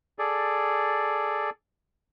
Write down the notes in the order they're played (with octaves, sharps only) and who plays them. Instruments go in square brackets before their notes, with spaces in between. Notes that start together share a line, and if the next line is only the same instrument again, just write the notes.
[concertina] G#4 A4 D5